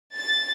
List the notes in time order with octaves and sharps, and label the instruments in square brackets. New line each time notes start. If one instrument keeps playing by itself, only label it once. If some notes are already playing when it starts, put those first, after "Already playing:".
[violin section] A6